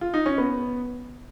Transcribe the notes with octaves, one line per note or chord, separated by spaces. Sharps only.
F4
D#4
C#4
B3